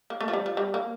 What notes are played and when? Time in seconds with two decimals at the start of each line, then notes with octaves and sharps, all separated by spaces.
0.10 A#3
0.20 A3
0.28 F3
0.33 G3
0.46 F3
0.57 G3
0.74 A#3